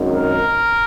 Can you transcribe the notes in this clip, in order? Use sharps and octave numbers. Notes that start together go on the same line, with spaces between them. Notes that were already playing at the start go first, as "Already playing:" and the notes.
Already playing: G#1 F#2 D#3
A#4